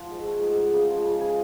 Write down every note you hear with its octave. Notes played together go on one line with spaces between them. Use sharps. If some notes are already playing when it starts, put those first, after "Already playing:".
Already playing: F3 F#4
G#2
A3
G#2
G#2
C#3
F3
C#3
C#3 G#4